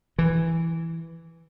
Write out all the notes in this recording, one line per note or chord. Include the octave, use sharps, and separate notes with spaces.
E3